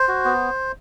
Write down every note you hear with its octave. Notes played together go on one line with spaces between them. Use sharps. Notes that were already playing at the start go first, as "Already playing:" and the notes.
Already playing: C5
F#4
B3